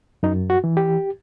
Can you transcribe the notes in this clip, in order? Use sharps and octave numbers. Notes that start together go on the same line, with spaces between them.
F#2 D#4
F#4
E3
G4